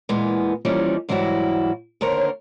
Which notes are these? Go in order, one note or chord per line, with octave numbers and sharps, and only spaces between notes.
A#2 E3 G#3 A#3 B3
E3 F3 G3 A#3 C#4 D#4
G#2 E3 F#3 G3 E4 F#4
D#2 D3 A#4 C5 C#5